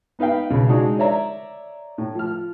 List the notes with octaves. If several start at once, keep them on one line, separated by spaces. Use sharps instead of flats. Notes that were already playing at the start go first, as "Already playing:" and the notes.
B3 D#4 B4 F5 G5
B1 C#3
G#3 D4 D#4 F#4
C#5 D5 E5 A#5
A2
F3 F6